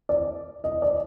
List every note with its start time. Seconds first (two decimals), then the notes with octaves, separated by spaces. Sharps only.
0.09 D5
0.64 D#5
0.82 D5